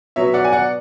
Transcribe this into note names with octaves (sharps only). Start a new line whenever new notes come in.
B2 F#3 B3 C#5 E5
D5 F#5
G#5
D5 F#5